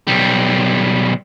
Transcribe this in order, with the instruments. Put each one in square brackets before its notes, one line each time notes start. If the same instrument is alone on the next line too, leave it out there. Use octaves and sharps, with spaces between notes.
[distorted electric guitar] B1 G3